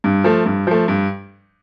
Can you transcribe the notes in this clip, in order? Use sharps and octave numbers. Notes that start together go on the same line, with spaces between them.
G2
F3 A3
G2
F3 A3
G2